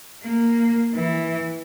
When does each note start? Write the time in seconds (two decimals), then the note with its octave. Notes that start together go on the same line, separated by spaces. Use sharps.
0.23 A#3
0.94 E3